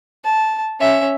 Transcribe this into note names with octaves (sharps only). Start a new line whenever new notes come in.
A5
C#4 E5